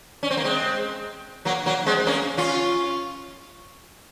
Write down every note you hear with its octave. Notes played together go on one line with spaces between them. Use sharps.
C#4
C4
A#3
G#3 C4
F#3 A#3
F#3 A#3
G#3 C4
A#3 C#4
C#4 F4